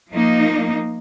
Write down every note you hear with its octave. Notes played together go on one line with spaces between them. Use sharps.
F3 A#3 D#4